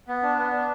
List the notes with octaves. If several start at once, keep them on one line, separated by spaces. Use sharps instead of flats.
B3
D4
B3
D4